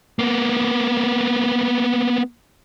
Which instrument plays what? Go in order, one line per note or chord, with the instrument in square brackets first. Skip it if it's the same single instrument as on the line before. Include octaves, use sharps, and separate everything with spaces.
[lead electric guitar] A#3 B3